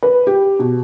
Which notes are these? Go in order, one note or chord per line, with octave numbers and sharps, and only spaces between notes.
B4
G4
B2